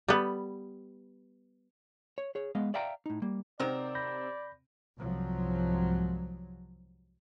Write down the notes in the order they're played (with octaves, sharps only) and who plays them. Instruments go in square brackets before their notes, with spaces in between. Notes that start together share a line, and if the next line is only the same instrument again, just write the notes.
[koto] G3 B3
[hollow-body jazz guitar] C#5
G#4 C#5
G#3 B3 D#5 F5
D5 E5 F5 G5 A#5
A2 D#4
G3 A#3
[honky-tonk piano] C3 C4 [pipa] D#3 F#3 A#4 [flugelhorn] D5
[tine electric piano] B5 G6 A#6
[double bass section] C2 G#2 F3 F#3